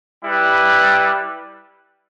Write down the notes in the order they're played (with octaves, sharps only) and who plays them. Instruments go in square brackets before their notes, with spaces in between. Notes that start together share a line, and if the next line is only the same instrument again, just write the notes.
[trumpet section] G3 E4 G4 B4